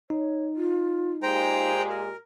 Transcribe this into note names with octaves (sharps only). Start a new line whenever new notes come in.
D#4 C#5
F4
A#2 G#3 G4 C5 G5 A#5
A#4